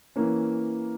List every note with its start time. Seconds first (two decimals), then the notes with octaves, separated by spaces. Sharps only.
0.16 E3 A#3 C#4